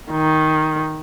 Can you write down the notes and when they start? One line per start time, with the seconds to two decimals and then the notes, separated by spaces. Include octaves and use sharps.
0.12 D#3